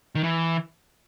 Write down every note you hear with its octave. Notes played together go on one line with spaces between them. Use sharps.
D#3
E3